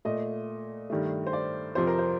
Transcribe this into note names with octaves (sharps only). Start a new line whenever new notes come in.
A#2 A3 D#5
G2 D#3 A3
C5
D5
F2 C3 F3 C5
A#4
C5